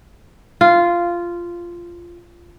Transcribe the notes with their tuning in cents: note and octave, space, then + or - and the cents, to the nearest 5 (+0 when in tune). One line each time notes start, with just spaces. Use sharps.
F4 -10